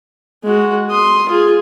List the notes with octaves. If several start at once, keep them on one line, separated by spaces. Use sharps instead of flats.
G#3 F#4
C6 D#6
F4 G#4